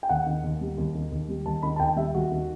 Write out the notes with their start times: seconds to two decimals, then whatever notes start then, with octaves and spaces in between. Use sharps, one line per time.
0.03 G5
0.09 D#2 F#5
0.26 D#3
0.43 D#2
0.61 G3
0.78 D#2
0.95 D#3
1.12 D#2
1.28 G3
1.46 D#2 A5
1.63 D#3 B5
1.76 A5
1.80 D#2 G5
1.96 G3 E5
2.14 D#2 F#4
2.31 D#3